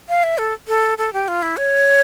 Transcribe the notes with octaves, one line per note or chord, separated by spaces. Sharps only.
F5
E5
A4
A4
A4
G4
F4
E4
C#5